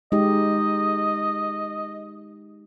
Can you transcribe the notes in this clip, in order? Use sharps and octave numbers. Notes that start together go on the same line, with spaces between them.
G#3 D#4 G4 D#5